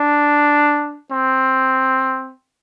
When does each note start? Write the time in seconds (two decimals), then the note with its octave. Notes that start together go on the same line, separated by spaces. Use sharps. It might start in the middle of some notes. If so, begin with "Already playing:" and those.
Already playing: D4
1.11 C4